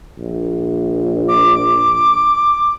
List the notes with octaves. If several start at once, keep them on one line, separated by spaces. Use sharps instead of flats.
A#1
D6